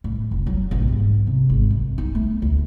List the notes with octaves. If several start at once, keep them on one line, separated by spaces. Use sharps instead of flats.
A2
F1
F#3
A1
G#2
C3
G#1
F#2
D#4
A3
D2